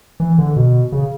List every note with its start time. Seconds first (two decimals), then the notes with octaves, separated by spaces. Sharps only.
0.20 E3
0.38 D3
0.56 B2
0.92 C#3